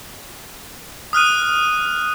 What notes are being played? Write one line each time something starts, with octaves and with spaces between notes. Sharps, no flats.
D#6 F6 F#6 D#7